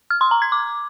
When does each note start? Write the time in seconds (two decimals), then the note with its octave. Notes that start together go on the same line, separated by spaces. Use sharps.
0.10 F6
0.21 C6
0.31 A#5
0.42 G#6
0.52 D6